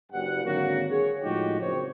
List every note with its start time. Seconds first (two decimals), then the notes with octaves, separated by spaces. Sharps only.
0.11 F#1 G2 F#5
0.44 G#1 D3 F#3 A#3 F#4
0.90 G#4 C#5
1.23 A2 F3 G#3 D#4 F#4 G4
1.59 F#1 C4 C#5